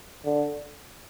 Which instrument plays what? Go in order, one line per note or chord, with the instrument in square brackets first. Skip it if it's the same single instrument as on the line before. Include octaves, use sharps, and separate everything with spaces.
[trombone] D3